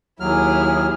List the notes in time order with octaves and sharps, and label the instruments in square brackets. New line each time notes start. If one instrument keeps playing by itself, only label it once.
[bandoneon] D#2 F#3 F6 [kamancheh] E4 G#4